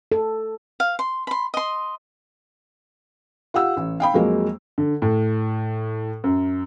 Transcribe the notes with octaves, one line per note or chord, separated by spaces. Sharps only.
A4
F5
C6
B5 C6
D#5 C6
F4 G4 F#5 E6
A1
F5 G5 B5
F2 F#3 G#3 A#3
D3
A2
F#2